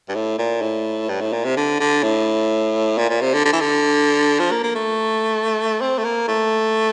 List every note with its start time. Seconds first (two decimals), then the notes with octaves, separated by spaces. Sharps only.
0.09 G2
0.15 A2
0.38 A#2
0.62 A2
1.09 G2
1.21 A2
1.33 A#2
1.44 C3
1.56 D3
1.80 D3
2.03 A2
2.98 A#2
3.10 A#2
3.21 C3
3.33 D3
3.45 D3
3.53 E3
3.60 D3
4.39 F3
4.51 A#3
4.63 A#3
4.75 A3
5.81 C4
5.98 A3
6.04 A#3
6.28 A3